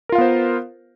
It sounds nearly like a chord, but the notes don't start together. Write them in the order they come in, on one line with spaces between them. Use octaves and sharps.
A#4 F4 F5 B3 C5